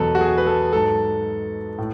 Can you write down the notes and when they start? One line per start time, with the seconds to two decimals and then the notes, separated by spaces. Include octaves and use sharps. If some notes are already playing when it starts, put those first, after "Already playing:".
Already playing: E2 B2 F#3 A4 B4
0.15 F#4
0.21 G#4
0.38 B4
0.46 A4
0.73 G#2 F#3 A4
1.78 A2